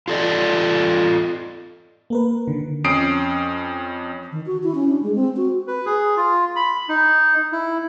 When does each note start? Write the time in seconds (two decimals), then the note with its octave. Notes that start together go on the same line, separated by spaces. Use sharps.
0.08 F4 A4 D5 D#5
2.10 A#3 A#4 B4
2.48 D3 D#3
2.84 F2 C#4 D#6 C7 D7
4.32 D#3
4.46 F#4
4.63 E4
4.75 C#4
4.89 D4
5.03 G#3
5.15 C4
5.37 F#4
5.67 B4
5.86 G#4
6.17 F4
6.56 B5
6.89 D#4
7.52 E4